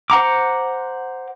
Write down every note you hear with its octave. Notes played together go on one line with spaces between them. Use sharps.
C5 F#5 A#5 D6